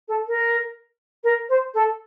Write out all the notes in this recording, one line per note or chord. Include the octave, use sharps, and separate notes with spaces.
A4
A#4
A#4
C5
A4